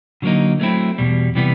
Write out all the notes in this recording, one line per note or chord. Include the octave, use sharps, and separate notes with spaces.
D3 F#3 A#3 D#4
F#3 A3 C4 E4
E2 B2 G3
C3 E3 G3 B3